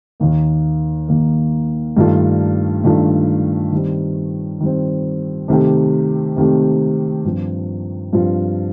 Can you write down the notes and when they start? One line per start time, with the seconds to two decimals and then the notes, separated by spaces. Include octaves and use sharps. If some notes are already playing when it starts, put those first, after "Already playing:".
0.20 D#2 D#3 A#3
1.08 D#2 D#3 A#3
1.97 G2 D#3 A3 D4 F4
2.84 G2 D#3 A3 D4 F4
3.72 D#3 G3 C4
4.61 D#3 G3 C4
5.48 C3 D#3 A3 C4 G4
6.36 C3 D#3 A3 C4 G4
7.24 G2 F3 C4 F4
8.13 G2 F3 C4 F4